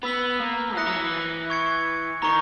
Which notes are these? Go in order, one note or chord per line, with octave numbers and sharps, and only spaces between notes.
B3 B5 E6 B6 F#7
A#3
E3 D#6 F#6 A#6 C#7
F#3
E3
C#6 G#6 C#7
D#3 A#5 C#6